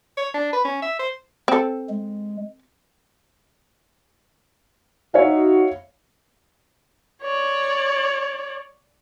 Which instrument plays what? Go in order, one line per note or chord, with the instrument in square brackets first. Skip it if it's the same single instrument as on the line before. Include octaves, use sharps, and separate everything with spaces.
[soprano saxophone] C#5
D4
B4
C#4
E5
C5
[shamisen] C4 A4
[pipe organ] G#3
[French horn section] D#4 F#4 [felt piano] C#5 E5 F5
[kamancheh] C#5 D5